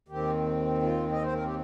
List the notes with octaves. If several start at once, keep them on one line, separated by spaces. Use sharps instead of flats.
D#2 D#3 C4 G4
F4
D#5
C5
A#4
G4